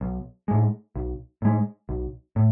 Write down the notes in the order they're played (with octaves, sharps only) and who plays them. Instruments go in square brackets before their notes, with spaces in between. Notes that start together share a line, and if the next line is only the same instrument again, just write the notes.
[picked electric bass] B1
A2 G#3
B1
A2 G#3
B1
A2